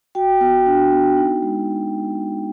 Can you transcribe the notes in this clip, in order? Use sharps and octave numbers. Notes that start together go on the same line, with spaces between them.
F#4 G5
B3
D4
B3
D#4
G#3